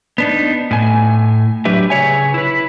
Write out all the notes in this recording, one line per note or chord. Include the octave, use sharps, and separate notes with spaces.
B3 D4 D#4
A2 G#5
F#3 D4 G4 B4 E5
C#3 G#4 B4 C#5 E5 G#5
E4 B4